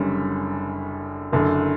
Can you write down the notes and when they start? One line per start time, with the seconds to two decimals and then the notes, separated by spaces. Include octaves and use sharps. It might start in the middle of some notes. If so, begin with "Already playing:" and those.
Already playing: F#1 F#2 D3 G3 C#4
1.32 F#1 F#2 D3